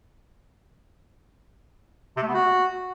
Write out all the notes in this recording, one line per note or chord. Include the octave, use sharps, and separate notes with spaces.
C3
A3
B3
F#4